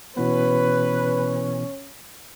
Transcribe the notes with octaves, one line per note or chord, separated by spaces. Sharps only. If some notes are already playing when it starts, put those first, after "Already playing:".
B2 E3 B3 C#4 B4